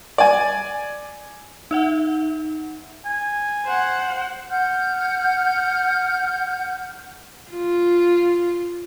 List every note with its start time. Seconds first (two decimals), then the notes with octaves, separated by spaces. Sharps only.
0.18 D5 G#5
1.71 D#4 E5 F#5
3.05 G#5
3.65 C5 F#5
4.51 F#5 F6 G6
7.51 F4